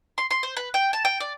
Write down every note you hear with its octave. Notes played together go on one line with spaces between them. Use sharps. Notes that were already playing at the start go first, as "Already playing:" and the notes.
C6
C6
C5
B4
G5
A5
G5
D5